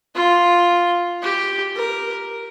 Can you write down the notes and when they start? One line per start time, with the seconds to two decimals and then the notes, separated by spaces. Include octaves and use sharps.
0.15 F4
1.23 G4
1.75 A#4